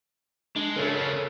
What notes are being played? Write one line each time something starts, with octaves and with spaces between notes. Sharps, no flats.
G#3 D4
C#3 A4 A#4 C#5 E5